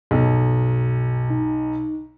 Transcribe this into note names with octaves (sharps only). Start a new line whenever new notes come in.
B1 G2 B2
D#4